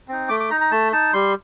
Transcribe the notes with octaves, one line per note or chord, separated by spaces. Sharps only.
C4 D#4
A3 D6
D6
D#4 A#5
A#5
A3 A5
D#4 A5
G3 C6